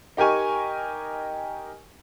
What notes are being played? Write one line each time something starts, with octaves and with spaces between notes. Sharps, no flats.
D#4 G4 A#4 G#5 C#6